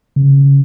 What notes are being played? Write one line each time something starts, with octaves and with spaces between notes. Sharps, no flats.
C#3